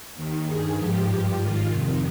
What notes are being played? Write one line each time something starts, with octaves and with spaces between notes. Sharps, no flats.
D#2 D#3
G2 D#3 G#4
G#2 F3 G4
G2 F3
G#2 D#3 F4
F2 C3 D#3